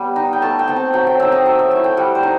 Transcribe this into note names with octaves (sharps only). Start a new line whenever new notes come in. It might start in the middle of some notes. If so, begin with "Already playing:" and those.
Already playing: G3 B3
D#4
G5
A3 A5
G5
C4 D#4
A5
F#3 G5
G5
C4 D#4 E5
D#5
F#3 E5
E5
A3 E4
G5
G3 F#5
C5
D#4